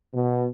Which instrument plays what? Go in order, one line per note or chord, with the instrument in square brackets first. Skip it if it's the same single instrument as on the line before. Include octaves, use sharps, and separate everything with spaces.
[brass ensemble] B2